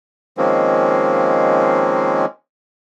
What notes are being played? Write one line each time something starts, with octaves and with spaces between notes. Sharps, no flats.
D#3 F3 G#3 A#3 C4 C#4